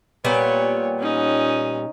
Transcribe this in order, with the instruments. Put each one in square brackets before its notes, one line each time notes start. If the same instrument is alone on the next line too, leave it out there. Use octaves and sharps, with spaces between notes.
[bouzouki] A#2 G3 B3 [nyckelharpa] C#5
[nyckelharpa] C#4 D#4